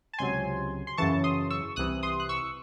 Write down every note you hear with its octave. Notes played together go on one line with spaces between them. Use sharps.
A5
C#2 C3 F#3 G#5 C6
C6
F#2 C#3 E3 A5 C#6
C6 D#6
C#6 E6
C2 C3 E3 D#6 F#6
C6 D#6
F#6
C#6 E6